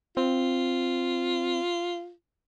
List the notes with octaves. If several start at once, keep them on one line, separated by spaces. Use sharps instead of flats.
C4 F4